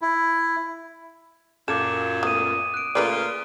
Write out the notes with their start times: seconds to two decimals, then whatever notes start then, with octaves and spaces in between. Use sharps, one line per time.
0.02 E4
1.68 F#2 A#2 A4 D6 E7
2.23 A3 B3 D#6 D#7
2.74 F#6 D7
2.95 A#2 C#3 A3 F4 B4 D5